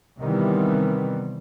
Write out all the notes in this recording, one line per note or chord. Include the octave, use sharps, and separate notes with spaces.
C3 D#3 E3 G3 B3 C4